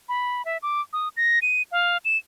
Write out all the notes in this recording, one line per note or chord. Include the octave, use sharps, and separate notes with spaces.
B5
E5
D6
D#6
A#6
D#7
F5
E7